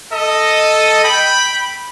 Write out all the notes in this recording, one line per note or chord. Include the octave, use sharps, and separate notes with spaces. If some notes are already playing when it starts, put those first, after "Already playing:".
A4 D#5
G5 B5